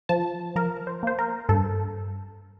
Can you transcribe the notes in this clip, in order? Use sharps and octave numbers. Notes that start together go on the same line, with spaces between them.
F3 A5
F3 A#4
C5
A#3 C5
A#4
G2 A4